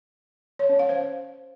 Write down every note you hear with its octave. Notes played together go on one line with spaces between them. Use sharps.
C#5
C#4
F5
C5